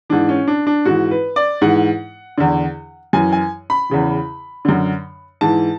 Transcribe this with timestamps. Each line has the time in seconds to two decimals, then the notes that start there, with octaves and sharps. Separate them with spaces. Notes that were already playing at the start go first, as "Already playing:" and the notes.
0.10 G#2 E3 D4
0.29 C#4
0.48 D4
0.67 D4
0.85 G#2 E3 F#4
1.11 B4
1.36 D5
1.62 G#2 E3 F#5
2.38 E2 D3
3.13 F#2 E3 G#5
3.32 G#5
3.70 B5
3.90 E2 C#3 E3
4.65 F#2 D3
5.41 G#2 E3 A5